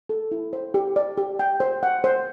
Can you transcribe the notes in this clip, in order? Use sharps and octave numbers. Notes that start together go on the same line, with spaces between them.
A4
E4
C5
G4
D5
G4
G5
C5
F#5
C5